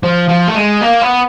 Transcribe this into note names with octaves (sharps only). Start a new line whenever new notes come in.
F3
F3
A3
G#3
A#3
B3